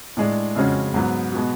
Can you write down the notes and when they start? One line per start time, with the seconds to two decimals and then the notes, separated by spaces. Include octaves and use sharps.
0.17 A2 G#3 D4
0.56 F2 C#3 G#3 C#4 F#4
0.94 G#2 F#3 B3
1.33 B2 G#3 B3 F#4